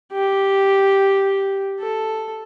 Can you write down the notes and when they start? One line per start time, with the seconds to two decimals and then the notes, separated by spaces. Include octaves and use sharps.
0.13 G4
1.80 A4